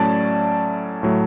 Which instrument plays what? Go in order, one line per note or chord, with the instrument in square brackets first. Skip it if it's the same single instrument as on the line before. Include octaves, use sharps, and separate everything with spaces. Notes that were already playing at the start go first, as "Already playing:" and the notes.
Already playing: [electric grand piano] A2 F#3 A3 C#4 D5 A5
A2 F#3 A3